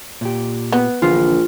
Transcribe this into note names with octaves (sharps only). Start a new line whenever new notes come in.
A#2 G4
B3
A#1 D3 E3 F4